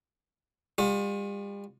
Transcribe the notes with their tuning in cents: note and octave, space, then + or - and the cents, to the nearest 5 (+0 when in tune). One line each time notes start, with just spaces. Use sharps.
G3 +40 F4 +40